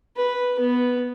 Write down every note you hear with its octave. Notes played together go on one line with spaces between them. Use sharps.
B4
B3